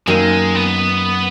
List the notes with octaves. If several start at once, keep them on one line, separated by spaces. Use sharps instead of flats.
F#2 D#3 G#3 A#3
B3